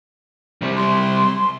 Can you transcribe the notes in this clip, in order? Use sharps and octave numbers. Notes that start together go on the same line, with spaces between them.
C3 G3
C6